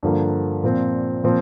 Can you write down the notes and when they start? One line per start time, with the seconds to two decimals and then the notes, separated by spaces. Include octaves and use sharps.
0.03 G2 D3 F3 A#3
0.63 A#2 F3 C4
1.24 A#2 F3 C4 F4